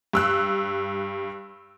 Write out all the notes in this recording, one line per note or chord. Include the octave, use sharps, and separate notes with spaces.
G2 E6 F#6